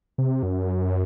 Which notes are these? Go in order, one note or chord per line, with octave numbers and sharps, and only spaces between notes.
C3
F#2